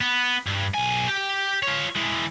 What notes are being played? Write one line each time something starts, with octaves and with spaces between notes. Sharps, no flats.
B3
G2
B1 G#5
G4
F4 C#5
E3 G#3